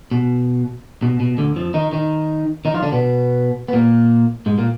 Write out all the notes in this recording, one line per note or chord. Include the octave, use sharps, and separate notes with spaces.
B2
B2
B2
D2 D3
F2 F3
D#3 D#4
D#3 D#4
D#3 D#4
F3 F4
D3 D4
B2 B3
B3
A#2 A#3
G#2 G#3
A#2 A#3